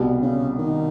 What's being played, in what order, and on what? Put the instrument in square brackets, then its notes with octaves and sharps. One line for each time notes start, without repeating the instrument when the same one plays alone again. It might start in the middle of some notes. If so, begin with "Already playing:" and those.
Already playing: [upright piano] C2 B2 G3
[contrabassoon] C#3
D#3